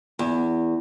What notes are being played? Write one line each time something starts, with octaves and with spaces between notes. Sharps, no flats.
E2